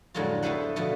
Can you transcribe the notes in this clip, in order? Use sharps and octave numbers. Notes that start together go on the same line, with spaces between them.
F2 A2 D3 F#3 G#3 F4
A3 B3 E4 B4 C5 F#5
B2 D3 F3